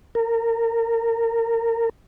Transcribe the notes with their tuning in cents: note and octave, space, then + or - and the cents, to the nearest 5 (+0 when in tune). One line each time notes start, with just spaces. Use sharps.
A#4 -25